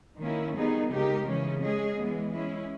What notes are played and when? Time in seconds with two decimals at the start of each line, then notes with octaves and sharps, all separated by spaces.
0.18 D#3 A#3 C#4 E4
0.54 D#3 G3 B3 D#4 G#4
0.90 C#3 G#3 D#4 G4 A#4
1.26 C#3 E3 G#3 C#4
1.61 G#3 C#4 G#4 D#5
1.96 E3 G#3 B3
2.31 G#3 C#4 E4